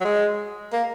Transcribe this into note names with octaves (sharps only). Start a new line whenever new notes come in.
F#3
G#3
A#3